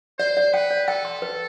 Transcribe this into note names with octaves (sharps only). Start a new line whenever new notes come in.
C5 D5
D5
B4 G5
D5
A4 G5
C6
B4